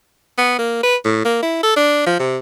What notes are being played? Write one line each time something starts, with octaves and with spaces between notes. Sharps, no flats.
B3
A#3
B4
A2
A#3
E4
A4
D4
F3
C3